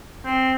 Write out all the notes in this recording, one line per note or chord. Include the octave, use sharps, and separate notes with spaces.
C4